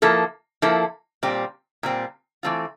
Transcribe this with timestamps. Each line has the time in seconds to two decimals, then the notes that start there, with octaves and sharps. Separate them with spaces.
0.02 F3 A#3 E4 A4
0.62 F3 A#3 E4 A4
1.23 A#2 G3 C4
1.83 A#2 G3 C4
2.43 E3 A3 C4 F4